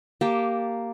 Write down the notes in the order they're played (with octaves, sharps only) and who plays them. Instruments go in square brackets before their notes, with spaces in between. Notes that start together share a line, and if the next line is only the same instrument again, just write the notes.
[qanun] A#3 G4 A5